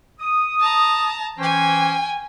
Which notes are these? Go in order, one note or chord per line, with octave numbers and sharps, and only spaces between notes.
D#6
A5 A#5
E3 C#4 C5 G5 G#5